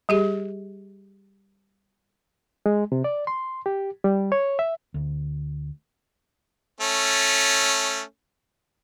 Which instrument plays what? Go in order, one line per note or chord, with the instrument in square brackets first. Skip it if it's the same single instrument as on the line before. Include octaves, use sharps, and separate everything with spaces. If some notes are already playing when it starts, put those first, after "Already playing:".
[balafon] G3 G4 G#4
[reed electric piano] G#3
C3
D5
C6
G4
G3
C#5
E5
[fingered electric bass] D2
[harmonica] A3 C#4